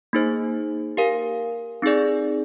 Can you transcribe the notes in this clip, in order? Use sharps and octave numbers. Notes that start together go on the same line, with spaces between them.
A#3 D#4 G#4 C5
G4 A#4 F5 G#5
C4 D#4 G#4 D5